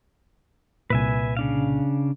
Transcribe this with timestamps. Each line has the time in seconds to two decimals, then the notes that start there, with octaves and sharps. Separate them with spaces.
0.90 C2 A#2 B4 E5 G#5
1.37 C#3 D4 F5